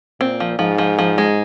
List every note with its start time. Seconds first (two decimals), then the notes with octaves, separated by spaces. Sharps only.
0.20 A#2 C4
0.40 F3
0.59 G#2 F3
0.78 F3
0.99 F3
1.18 G#3